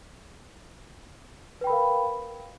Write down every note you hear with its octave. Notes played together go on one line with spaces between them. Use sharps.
A#4 B4 F5 G5 B5